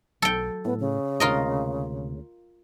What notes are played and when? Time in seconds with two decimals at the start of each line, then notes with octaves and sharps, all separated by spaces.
0.22 B1 F#3 A4 G5
0.65 A2 B3
0.80 C#3
1.20 D2 C3 G#3 F4 A#4 D#5